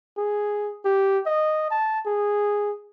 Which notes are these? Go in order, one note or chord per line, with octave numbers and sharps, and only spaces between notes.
G#4
G4
D#5
A5
G#4